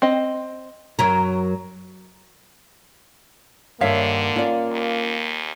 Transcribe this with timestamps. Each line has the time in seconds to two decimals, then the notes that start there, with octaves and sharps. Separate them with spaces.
0.02 C4 D#5
0.99 F#2 F#3 A#4
3.81 G2 D3 D#3 A#3 C#5 E5 F5
4.36 C#4 F4 D5
4.72 D#2